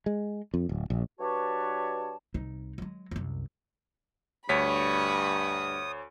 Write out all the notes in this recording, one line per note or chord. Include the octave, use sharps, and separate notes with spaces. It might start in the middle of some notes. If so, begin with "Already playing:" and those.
G#3
F2
D1
A#1
G2 F#4 B4 C#5 D5 A5
C2 D#4
F#3 G#3
C2 F#2
D2 G2 C#5 B5 C#6 D#6 B6